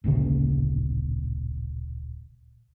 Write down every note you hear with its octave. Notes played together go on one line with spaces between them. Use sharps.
D1 A#1 A#2 C#3